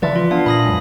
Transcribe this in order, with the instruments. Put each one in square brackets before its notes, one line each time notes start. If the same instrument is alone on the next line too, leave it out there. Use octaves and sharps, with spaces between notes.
[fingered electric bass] C#3 E3 F3 [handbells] B4 D5 E5
[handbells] F4 B4
[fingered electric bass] B3 [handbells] D4 F5
[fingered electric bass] A#2 [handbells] B5 D#6 A#6
[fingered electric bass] F2 F#3 G#3